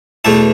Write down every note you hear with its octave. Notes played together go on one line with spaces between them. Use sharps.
E2 B2 A3 E4 A5